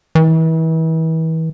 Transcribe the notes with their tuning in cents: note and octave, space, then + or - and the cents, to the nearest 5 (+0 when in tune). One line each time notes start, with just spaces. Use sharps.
E3 -35